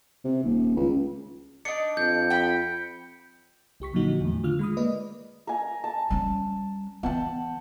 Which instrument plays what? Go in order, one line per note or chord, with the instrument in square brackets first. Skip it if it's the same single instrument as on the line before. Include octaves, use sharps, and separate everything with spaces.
[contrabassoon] C3
D#1
C#2
[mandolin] D4 D#4 [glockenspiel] C#7
[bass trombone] F2 [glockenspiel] G6
[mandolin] G5 B5
[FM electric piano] C2 G4 C#6 B6
A#2 D3 F3 F#3 D#4 F#4
E2 A2
D3 D#3 F4 F6
G#3 B5 D#6
A#3 B4 D5 D#5
[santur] A#4 G#5
A5
[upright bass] G3 C#4
[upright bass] E3 B3 [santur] F#5 G5 A5